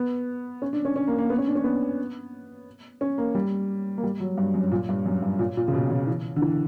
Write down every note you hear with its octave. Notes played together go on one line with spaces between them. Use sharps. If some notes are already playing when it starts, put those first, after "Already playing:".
Already playing: B3
C#4
D4
C#4
C#4
A#3
A#3
B3
C#4
D4
C#4
B3
C#4
A#3
G3
A#3
G3
F#3
G2
F#2
A#2
G2
F#2
G2
A#2
A#2
C#3
B2
C#3
E3
D3
E3